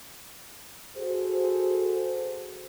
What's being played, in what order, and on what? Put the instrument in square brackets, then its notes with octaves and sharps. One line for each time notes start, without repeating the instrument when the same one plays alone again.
[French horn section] F#4 G#4 A4 C5